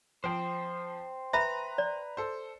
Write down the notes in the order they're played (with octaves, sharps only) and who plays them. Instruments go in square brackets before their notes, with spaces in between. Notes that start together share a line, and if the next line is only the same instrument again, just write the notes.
[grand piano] F3 [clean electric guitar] C5 G5
[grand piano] B4 A#5 [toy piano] E5 B5
[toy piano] D5
[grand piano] A4 C5